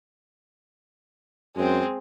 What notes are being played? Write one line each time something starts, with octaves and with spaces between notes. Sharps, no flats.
F#2 G#3 C4